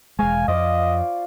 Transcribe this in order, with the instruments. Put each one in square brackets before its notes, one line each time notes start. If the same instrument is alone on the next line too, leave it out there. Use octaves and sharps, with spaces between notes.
[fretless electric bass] E1 G#3 [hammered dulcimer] C#5 F5 [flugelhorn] G#5
[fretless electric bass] F2 [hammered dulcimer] F4 C5 D5 [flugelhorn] D#5
[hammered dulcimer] D5